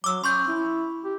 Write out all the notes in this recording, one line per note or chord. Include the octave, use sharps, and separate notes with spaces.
F#3 D6 E6
C#4 C6 C#6 G6
E4
G4